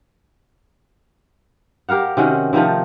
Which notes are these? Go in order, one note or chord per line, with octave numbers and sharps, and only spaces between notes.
G4 A#4 F5 F#5
C3 D#3 C#4 F#4
C3 D#3 F3 A3